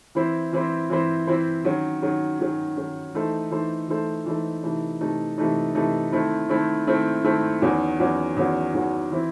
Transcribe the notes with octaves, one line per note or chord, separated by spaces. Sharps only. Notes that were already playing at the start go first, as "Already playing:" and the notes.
E3 C4 E4 C5
E3 C4 E4 C5
E3 C4 E4 C5
E3 C4 E4 C5
D#3 F#3 C#4
D#3 F#3 C#4
D#3 F#3 C#4
D#3 F#3 C#4
E3 A3 D#4 A4 C5
E3 A3 D#4 A4 C5
E3 A3 D#4 A4 C5
E3 A3 D#4 A4 C5
C3 E3 A3 D#4
C3 E3 A3 D#4
C3 E3 A3 D#4
C3 E3 A3 D#4
D#3 A3 C4 E4
D#3 A3 C4 E4
D#3 A3 C4 E4
D#3 A3 C4 E4
E2 D#3 F#3 C#4 F#4
E2 D#3 F#3 C#4 F#4
E2 D#3 F#3 C#4 F#4
E2 D#3 F#3 C#4 F#4
E3 C4 E4